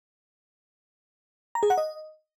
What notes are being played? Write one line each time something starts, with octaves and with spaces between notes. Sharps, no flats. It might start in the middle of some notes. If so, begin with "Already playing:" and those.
A#5
G#4
F#5
D#5